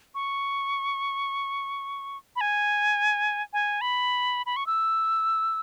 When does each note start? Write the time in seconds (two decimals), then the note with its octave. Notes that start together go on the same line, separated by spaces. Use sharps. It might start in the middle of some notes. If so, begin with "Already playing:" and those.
0.15 C#6
2.36 B5
2.41 G#5
3.53 G#5
3.81 B5
4.46 B5
4.56 C#6
4.67 E6